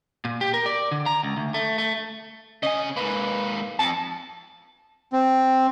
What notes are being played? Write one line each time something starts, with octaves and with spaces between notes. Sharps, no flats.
A#2
G4
A#4
D5
D3
A#5
C#2
D2
A3
A3
C#3 D#5 G#5
G#2 A#3 B4
F2 A5
C4